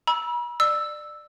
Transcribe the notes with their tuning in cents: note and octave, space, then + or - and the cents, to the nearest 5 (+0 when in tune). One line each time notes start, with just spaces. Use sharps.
B5 -45 E6 +0
D5 +25 E6 +0